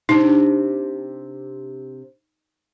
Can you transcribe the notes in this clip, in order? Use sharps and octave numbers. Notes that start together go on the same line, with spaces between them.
C3 D4 D#4